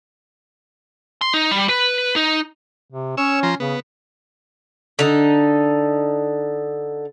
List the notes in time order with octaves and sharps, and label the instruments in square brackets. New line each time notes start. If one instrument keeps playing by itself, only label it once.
[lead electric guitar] C6
D#4
G3
B4
D#4
[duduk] C3
[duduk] C#4 [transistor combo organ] C#5 E6
[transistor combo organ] F3 A#5 C6
[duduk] C#3 [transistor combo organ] B3
[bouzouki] D3 D#4